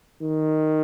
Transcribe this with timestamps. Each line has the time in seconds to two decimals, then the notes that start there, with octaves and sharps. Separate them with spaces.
0.22 D#3